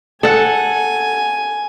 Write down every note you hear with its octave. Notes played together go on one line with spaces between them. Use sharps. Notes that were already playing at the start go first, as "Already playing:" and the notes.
A4 F#5 G#5